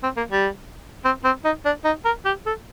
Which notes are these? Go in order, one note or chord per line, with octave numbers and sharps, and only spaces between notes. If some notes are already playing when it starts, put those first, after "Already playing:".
C4
A#3
G3
C4
C4
D#4
D4
D#4
A#4
G4
A4